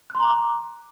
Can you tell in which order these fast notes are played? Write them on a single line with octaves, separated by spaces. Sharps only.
F#6 C6 A#5 D6